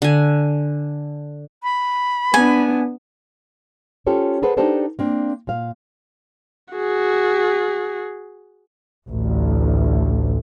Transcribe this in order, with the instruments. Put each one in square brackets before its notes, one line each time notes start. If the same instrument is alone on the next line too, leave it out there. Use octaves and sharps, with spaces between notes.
[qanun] D3 G#5
[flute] B5
[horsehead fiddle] B3 D4 [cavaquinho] G#5
[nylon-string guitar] C#4 F4 G4 A4 C5 C#5
G#4 A4 B4 C5 F#5
D4 D#4 G4 A4 C5 D5
A#3 C4 D4
A#2 F5
[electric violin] F#4 G#4
[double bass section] A1 D2